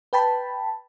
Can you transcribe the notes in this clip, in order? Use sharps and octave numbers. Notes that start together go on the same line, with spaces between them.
B4 G5 A5 B5